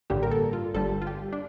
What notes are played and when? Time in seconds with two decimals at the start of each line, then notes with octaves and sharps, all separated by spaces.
0.10 A1 G2 D3 G3 A#3 G4
0.23 A#4
0.31 A4
0.53 F4
0.74 G1 G2 D3 G3 A4
1.02 F4
1.07 G4
1.32 D4